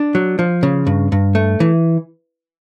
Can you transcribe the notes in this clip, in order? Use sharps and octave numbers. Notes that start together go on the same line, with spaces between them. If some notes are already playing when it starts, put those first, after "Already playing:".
Already playing: D4
F#3
F3
C#3
G2
G2
A3
E3